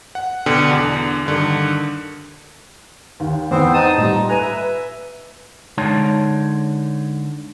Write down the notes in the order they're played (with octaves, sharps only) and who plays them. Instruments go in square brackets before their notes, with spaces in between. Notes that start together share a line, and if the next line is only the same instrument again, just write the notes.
[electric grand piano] F#5
B2 D3 G5
E2 D3
G2 D3 D#3
[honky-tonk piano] D#2
[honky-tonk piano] E2 G#2 [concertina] B3 C4 C5
[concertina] D#4 A5 D#6
[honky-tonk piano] A#2 G3 [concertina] D#4
[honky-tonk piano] B4 D#7 [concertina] G#5 A#5
[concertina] E5
[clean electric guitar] D3 G#3 D#4 C#5 A5 C6